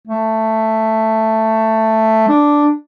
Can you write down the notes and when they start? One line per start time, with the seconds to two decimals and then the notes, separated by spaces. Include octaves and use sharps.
0.08 A3
2.29 D4